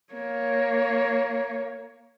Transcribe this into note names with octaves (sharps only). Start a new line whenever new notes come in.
A#3 C#5